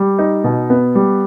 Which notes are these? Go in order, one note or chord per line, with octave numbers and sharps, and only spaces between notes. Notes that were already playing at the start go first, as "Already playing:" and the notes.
Already playing: G3
D#4
B2
B3
G3